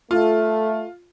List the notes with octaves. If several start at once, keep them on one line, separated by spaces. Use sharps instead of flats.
A3 F4